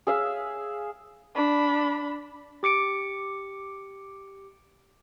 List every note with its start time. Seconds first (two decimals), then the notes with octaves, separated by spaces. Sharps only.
0.07 G#4 E5 F5
1.35 D4 B5
2.63 G4 D6 C#7 D7